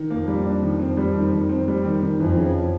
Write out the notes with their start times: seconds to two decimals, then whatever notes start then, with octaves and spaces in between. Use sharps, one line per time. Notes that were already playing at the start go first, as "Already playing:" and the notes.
Already playing: D#3
0.10 F2 A#3
0.28 G3
0.45 D4
0.62 D#3
0.80 C4
0.97 G3
1.15 D#3
1.33 D#3
1.49 C4
1.68 G3
1.85 D#3
2.03 D#3
2.20 F2 E3
2.37 C#3